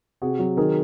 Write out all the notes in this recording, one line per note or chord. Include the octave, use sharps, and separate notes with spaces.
C3 F#4 G#4
F#3
D#3 G#4 A#4